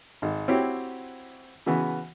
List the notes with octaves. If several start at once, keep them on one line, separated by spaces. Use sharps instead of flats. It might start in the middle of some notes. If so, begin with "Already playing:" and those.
G#1
C4 E4 F#4 G4 C#5
C#3 E3 B3 F#4